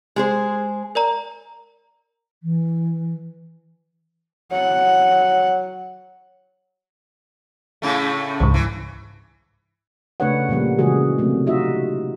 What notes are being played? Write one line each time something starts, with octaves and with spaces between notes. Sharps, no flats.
G#3 G#4 C5
A#4 D5 A#5
E3
F#3 F#5
A2 C#3 A3
C#2 G#2
E3
C#3 A3 D4 B4 C#5 F#5
A#2 F3 G3 A#3 F#5
C#3 E3 G#3 F#4 G#4
C3 F#3 A3
D#4 F4 F#4 D#5 E5